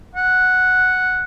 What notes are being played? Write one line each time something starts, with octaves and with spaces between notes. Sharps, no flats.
F#5